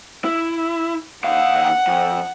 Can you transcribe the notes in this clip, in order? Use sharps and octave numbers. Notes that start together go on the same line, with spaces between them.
E4
D#2 F5 F#5
F2